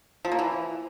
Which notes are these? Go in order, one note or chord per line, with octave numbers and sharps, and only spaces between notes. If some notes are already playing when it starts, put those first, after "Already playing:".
F3
A#3
E3